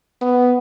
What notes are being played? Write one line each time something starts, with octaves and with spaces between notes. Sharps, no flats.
B3